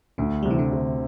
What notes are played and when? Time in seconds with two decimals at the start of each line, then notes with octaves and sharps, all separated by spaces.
0.18 D2 D3
0.43 C3 G3
0.51 E3
0.59 D3
0.72 C3